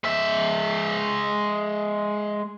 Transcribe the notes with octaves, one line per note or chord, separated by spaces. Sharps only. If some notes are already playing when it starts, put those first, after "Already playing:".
G#3 E5